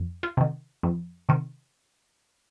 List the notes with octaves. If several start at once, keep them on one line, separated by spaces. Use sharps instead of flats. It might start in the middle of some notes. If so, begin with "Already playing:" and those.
Already playing: F2
F4
C3 D#3
F2
C3 D#3